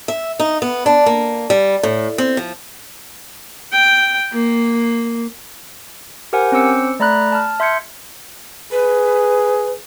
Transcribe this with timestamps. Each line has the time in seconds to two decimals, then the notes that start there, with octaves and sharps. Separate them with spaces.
0.08 E5
0.40 D#4
0.62 B3
0.86 D4
1.06 A#3
1.50 G3
1.83 A2
2.18 C4
2.37 F3
3.72 G5
4.33 A#3
6.33 G4 A#4 C5 F#5 G#5
6.52 C4 C#4 C5 D6 E6 C#7
7.00 A3 D5 A#5 B5 F#6
7.32 A5 F6
7.60 E5 C6 G6 G#6 C#7
8.72 G#4 B4